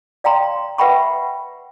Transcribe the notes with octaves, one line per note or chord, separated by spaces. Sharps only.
D5 F5 G5 A#5 C6
B4 E5 F#5 G5 B5 C#6